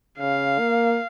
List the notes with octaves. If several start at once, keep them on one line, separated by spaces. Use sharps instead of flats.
C#3 F5
A#3